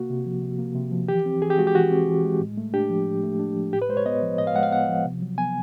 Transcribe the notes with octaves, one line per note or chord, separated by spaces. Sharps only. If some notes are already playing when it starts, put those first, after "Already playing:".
Already playing: C3 A#3 F#4
C3
F3
C3
A#3
C3
F3
E3 G4
C4
E3 G#4
G4
G#3 F#4
G4
E3 F#4
C4
E3
G#3
A2
A3
D4 G4
F3
A2
A3
D4
F3
A2 G4
B4
G#3 C5
C#5
B3 D#5
F3
A2 D#5
F5
G#3 F#5
F5
B3 F#5
F3
C3
F#3
B3 G#5